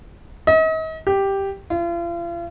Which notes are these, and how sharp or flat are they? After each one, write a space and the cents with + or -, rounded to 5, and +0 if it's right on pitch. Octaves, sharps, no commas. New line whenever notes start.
D#5 +40
G4 +0
F4 -40